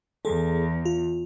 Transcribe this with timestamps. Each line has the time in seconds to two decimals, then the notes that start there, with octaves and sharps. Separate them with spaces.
0.25 E2 G#4 A4
0.86 F4